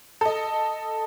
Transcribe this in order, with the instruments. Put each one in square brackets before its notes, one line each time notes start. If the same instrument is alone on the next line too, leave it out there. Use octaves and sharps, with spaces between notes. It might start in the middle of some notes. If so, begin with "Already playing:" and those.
[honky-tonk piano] A4 D#5